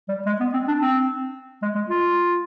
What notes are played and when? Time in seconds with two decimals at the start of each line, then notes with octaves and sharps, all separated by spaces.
0.09 G3
0.26 G#3
0.40 B3
0.53 C4
0.68 D4
0.81 C4
1.62 G#3
1.75 G#3
1.89 F4